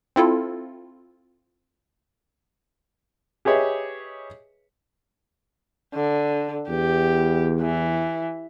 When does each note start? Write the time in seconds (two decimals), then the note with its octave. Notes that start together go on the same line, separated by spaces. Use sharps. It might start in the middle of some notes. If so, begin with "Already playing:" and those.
0.16 C4 E4 F4 A4
3.45 G4 G#4 B4 C#5 D#5 E5
5.95 D3
6.70 E2 G4
7.61 E3